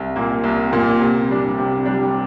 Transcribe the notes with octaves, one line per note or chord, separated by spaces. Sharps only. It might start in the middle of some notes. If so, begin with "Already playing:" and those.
Already playing: C2
A#2 A#3
C2
A#2 A#3
C3
G3 D4
C3
G3 D4